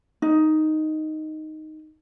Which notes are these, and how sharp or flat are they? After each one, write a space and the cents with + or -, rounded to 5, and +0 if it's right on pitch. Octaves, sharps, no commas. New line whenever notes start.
D#4 +0